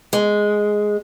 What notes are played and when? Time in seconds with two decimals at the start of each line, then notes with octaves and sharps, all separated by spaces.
0.13 G#3